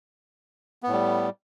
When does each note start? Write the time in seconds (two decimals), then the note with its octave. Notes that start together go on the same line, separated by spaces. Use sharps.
0.83 B3
0.88 A2
0.93 G3